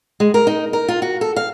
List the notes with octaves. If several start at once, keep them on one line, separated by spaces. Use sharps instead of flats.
G#3
A#4
D#4
A#4
F4
F#4
A4
F5